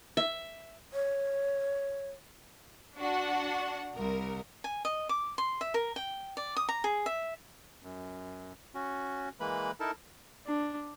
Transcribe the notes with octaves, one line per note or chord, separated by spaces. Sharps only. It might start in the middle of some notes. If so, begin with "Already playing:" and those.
E5
C#5
D4 F#4 F#5
C2 A#4
G#5
D#5
D6
C6
E5
A#4
G5
D5
D#6
A#5
G#4
E5
F#2
C#4 F#4
E3 G#3 A#3 B4 B5
D#4 E4 A4 A#4 A5
D4